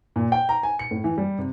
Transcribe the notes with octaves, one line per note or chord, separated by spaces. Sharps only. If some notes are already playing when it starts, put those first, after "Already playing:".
A#2
G5
A#5
G#5
C#7
A2
E3
G3
C3